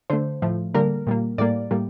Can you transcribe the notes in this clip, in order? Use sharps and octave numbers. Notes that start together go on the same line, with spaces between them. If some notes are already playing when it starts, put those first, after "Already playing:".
D3 A3 C5
A2 F3 A3
D3 G3 A#3 A#4
A#2 G3 A#3
A2 G3 A#3 D5
A2 G3 A#3